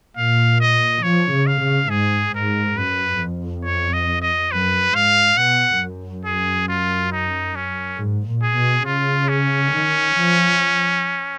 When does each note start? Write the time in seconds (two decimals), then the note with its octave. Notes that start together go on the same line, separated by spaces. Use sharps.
0.16 A#2 F5
0.60 D#5
1.03 F3 C#5
1.32 C#3
1.47 F5
1.61 C#3
1.90 G#2 G#4
2.34 G#2 A#4
2.77 F#2 B4
3.21 F2
3.64 C#5
3.93 D#5
4.22 D#5
4.51 F#2 B4
4.95 G#2 F5
5.37 B2 F#5
5.81 F#2
6.25 G#4
6.68 F4
7.12 D#4
7.55 C#4
7.99 G#2
8.28 A#2
8.43 G#4
8.56 B2
8.85 C#3 F4
9.29 C#4
9.72 D#3
10.16 F3